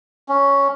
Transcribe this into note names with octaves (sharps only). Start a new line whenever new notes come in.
C#4